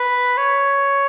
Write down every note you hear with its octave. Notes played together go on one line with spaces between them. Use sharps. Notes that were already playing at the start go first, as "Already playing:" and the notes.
Already playing: B4
C#5